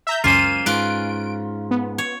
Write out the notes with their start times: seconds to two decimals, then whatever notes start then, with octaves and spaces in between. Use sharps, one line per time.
0.07 E5 A#5 G6
0.24 C#2 F#2 A#3 C#4 F4 C5 D#7
0.66 G#2 F4 B4 D7
1.71 B3
1.98 C#5